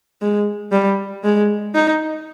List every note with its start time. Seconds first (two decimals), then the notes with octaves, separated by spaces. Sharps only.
0.22 G#3
0.72 G3
1.24 G#3
1.75 D#4